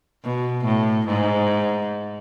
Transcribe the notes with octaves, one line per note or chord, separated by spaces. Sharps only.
B2
A2
G#2